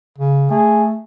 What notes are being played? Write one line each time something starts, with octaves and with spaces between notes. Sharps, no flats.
C#3
A3 G#4